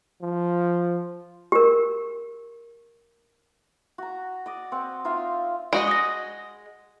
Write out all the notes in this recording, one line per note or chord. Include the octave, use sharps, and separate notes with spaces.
F3
G4 A#4
F#4 A#5
D5 D#5
C4 F#5
D#4 F4 E5 F5
G#3 F#4 D#5 D7
D#6 A#6